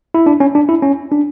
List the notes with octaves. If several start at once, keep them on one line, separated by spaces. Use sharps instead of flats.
E4
D4
C#4
D4
E4
C#4
D4